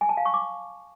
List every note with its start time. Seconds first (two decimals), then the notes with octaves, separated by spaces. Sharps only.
0.01 G#5
0.09 A5
0.17 F5
0.26 C#6
0.34 D6